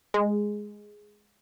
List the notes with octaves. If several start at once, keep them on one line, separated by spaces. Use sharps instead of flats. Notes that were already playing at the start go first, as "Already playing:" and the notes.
G#3